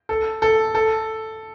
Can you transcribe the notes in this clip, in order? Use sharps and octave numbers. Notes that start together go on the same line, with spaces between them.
A4
A4
A4